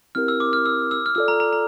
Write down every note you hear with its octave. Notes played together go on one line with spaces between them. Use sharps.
C4 E4 G4 A#4 F6
E6
D6
F6
E6
E6
F6
F4 A4 D5 E6
A#5
A#5
A#5